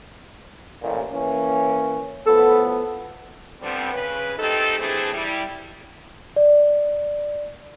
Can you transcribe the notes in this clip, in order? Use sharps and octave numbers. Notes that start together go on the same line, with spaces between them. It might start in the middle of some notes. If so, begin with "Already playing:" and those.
A1 A#2
E3 A#3 C#4
A2 F3 B3 A4
D3 F3 G3 B3 C4
C#3 B4
A3 C4 D#4 G4 A4
E3 A3 C4 D4 E4 G#4
G3 E4
D5